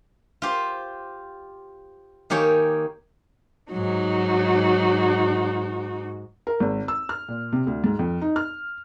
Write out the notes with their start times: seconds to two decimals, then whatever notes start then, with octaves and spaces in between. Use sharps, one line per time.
0.42 F4 G4 C5
2.30 D#3 A#3 G4 C#5 G#5
3.72 G#2 F#3 D#4 F#4
6.47 A#4
6.60 G#1
6.88 E6
7.09 F6
7.28 A#2
7.53 C3
7.67 D2
7.84 G#2
7.99 F2
8.21 D#4
8.36 F6